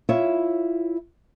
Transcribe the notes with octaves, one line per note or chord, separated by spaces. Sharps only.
E4 F4 C#5 E5